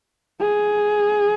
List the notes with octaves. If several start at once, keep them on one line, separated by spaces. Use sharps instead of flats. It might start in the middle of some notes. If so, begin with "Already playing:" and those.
G#4